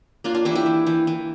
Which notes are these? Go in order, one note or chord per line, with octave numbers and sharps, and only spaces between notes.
A#3 D4 F4
D4 F4
E3 E4 G4
E4 G4
E3
E3
E3